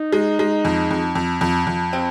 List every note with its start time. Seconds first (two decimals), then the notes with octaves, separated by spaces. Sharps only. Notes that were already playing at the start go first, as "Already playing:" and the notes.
Already playing: D#4
0.13 G#3
0.39 G#3
0.65 F2
0.91 F2
1.15 F2
1.41 F2
1.67 F2
1.93 C4